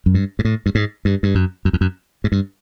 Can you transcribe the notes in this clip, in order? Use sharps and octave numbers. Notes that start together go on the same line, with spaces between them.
F#2
G2
G#2
A2
G2
G#2
G2
G2
F#2
F#2
F2
F#2
G#2
G2